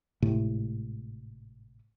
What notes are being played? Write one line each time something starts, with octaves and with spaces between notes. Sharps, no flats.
G#1 A2 C3 A3